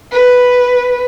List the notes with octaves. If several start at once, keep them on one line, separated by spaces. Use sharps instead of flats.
B4